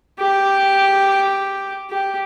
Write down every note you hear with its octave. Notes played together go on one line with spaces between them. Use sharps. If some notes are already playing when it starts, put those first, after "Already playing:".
G4
G4